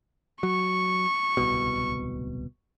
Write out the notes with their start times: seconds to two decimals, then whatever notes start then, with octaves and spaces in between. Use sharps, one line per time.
0.43 F#3 C#6
1.37 D1 C2 B2